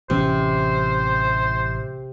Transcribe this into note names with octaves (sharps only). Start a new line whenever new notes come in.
A1 C3 E3 C#4 C5